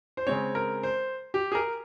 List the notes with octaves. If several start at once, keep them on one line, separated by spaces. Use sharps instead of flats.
C5
C#3 G#3 C4 C#5
A#4
C5
G4
G#4
A#4